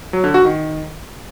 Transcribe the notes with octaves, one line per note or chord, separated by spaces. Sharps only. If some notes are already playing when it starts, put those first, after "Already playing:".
F#3
D3
F#4
D#3